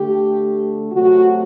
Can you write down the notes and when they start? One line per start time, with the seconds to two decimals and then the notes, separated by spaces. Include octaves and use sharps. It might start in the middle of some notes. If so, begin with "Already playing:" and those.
Already playing: D3 A3 G4
0.92 C3 F#3 A3 F#4